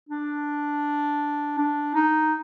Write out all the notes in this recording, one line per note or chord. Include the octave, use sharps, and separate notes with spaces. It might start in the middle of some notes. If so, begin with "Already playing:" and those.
D4
D4
D#4